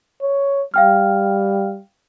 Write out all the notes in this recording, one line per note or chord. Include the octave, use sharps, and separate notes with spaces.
C#5
G3 F5 G5 F6